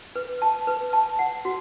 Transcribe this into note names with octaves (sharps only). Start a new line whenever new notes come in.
B4
A5
B4
A5
F#5
F#4